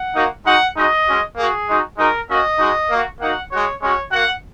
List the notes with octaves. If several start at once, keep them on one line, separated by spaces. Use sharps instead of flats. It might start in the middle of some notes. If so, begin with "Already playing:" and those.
Already playing: F#5
A#3 D#4 F#4
G#3 D#4 F#4 F#5
G#3 D#4 F#4 D#5
G#3 C#4 F#4
A#3 F#4 G#4
G#3 D#4 F#4
G#3 D#4 F#4 A#4
A#3 C#4 F#4 D#5
G#3 D#4 F#4
A#3 F#4
A#3 D#4 F#4 F#5
G#3 F#4 C#5
G#3 C#4 F#4 C#5
A#3 F#4 F#5